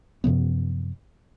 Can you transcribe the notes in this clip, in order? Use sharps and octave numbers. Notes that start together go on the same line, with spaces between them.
F#2 C3 F3 B3